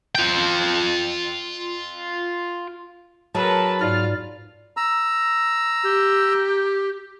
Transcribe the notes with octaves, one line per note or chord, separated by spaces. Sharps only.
F4 G5
F#3 G#4 A#4 B4 A5
G#2 F4 D5 F6
A#5 E6
G4